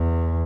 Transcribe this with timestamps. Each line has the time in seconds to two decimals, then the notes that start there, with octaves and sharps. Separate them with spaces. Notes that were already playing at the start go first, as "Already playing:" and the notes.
Already playing: E2